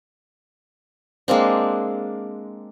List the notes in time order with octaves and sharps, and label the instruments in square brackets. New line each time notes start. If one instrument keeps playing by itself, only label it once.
[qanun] G#3 A#3 C4 D4